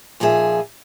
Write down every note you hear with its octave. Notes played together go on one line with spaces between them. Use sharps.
A#2 F3 D#4 G#4 E5